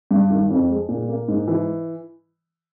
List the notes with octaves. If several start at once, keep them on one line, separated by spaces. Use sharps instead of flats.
G2
D#3
F2
G#3
A#2
A#3
G#2
E3